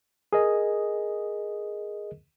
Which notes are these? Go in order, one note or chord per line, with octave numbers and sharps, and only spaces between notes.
G#4 A#4 D#5